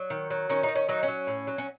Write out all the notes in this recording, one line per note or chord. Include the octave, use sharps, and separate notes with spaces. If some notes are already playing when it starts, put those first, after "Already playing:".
Already playing: F#3
D#3
F#3
D#3 C#4
D#4
D#3
C#4
F#3 D#4
C#4
F#3
A2
F#3
C#4